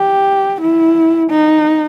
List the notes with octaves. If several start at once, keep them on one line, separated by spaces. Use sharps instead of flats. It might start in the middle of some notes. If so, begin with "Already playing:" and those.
Already playing: G4
E4
D#4